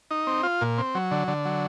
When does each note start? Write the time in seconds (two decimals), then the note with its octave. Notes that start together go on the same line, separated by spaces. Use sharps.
0.11 D#4
0.27 C4
0.43 F4
0.61 A#2
0.78 C4
0.95 F#3
1.11 D3
1.28 D3
1.45 F#3